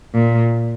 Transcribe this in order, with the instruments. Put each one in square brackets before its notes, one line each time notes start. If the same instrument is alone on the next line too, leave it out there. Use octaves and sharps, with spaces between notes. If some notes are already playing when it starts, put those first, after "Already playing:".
[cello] A#2